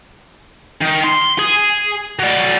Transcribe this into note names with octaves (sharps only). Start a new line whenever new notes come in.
D#3
C6
G#4
F#3 D5